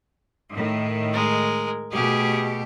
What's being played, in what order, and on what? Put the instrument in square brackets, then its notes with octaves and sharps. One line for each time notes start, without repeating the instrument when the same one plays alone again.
[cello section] A2 D#3
[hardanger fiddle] G#3 A#4
[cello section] B2 A3 G4 [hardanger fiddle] G#4